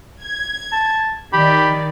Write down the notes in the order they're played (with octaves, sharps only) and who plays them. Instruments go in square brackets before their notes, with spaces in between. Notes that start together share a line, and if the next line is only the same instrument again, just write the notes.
[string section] G#6
[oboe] A5
[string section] D#3 D5 [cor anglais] G4 [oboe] B5